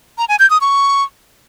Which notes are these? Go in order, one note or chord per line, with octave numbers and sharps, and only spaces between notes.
A#5
G#5
G6
D#6
C#6